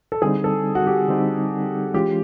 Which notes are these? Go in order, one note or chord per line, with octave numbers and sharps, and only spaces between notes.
A4
D3 G3 C4 D#4 G#4
A4
F#4
G4
D3 G3 C4 D#4
E3 G#3 C#4 F4 G4